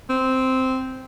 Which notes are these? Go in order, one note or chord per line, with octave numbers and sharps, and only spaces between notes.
C4